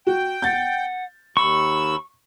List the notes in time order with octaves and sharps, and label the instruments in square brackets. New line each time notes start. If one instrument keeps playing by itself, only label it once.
[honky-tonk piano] F#4 [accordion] G5
[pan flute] F#5 [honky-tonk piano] G6 A6
[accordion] D#2 E6 [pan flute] B5 [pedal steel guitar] C#6